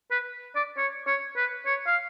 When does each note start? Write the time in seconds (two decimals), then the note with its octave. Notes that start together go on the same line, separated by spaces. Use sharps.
0.11 B4
0.56 D5
0.78 C#5
1.07 C#5
1.37 B4
1.66 C#5
1.87 F5